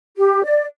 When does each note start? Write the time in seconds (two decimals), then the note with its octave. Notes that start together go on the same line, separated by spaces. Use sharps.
0.16 G4
0.43 D5